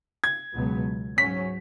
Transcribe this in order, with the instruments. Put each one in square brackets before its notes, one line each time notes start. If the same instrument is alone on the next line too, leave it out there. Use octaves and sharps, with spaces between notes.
[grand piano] G#6
[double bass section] C#2 B2 F#3 B3
[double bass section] G#2 F#3 C#4 [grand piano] B6